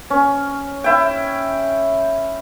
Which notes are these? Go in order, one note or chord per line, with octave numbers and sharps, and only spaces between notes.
C#4
E4 G5